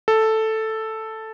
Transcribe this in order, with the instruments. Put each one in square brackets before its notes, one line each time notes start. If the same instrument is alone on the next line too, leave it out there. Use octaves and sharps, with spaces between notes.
[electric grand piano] A4